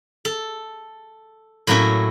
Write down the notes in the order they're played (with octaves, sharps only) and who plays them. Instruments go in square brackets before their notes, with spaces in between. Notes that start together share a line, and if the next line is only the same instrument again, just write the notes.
[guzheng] A4
A2 F#3 A#3 C#4 E4 F#4